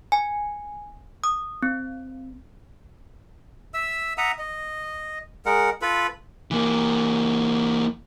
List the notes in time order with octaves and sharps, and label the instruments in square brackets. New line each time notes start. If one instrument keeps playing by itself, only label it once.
[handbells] G#5
D#6
C4
[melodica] E5 E6
E5 F#5 A#5 D#6
D#5
G#3 A#4 F#5
F4 A4 B4 B5
[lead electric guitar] E3 A#3